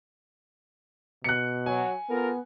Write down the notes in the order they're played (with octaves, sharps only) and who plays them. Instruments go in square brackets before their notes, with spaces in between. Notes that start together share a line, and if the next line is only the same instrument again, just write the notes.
[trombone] B2 [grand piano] F#6 C#7
[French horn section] F#3 [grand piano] G#5
[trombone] B3 [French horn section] F4 A4 A#4